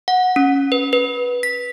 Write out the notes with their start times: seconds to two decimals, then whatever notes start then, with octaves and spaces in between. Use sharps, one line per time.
0.08 F#5
0.36 C#4
0.72 B4
0.93 B4
1.43 B6